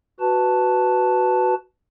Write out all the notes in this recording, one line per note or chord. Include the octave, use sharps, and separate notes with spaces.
F#4 B4 A5